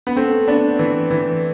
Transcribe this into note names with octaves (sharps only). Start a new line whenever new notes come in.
B3
A3 C4
B3 D4
E3
E3